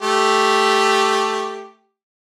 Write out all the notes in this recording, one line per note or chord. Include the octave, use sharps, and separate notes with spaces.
A3 G4